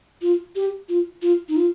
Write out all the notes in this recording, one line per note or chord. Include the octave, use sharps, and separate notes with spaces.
F4
G4
F4
F4
D#4
F4